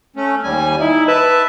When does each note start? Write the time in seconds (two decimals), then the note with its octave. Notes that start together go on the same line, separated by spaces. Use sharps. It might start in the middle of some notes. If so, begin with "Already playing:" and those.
0.16 A3 C#4
0.43 D#2 G3 G#5
0.80 D#4 E4
1.08 B4 E5 A5